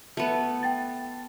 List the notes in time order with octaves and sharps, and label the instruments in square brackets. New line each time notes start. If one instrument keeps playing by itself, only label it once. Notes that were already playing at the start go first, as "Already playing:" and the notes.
[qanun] A3 B3
[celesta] G5 A6